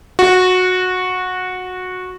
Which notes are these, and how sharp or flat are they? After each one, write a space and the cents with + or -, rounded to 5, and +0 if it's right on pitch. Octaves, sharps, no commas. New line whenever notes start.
F#4 -15